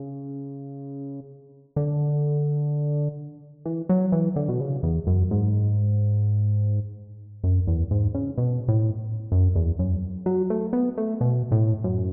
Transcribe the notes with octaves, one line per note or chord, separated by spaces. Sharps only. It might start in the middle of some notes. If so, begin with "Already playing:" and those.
Already playing: C#3
D3
E3
F#3
E3
D3
B2
C#3
E2
F#2
G#2
F#2
E2
G#2
C#3
B2
A2
F#2
E2
F#2
F#3
A3
B3
A3
B2
A2
F#2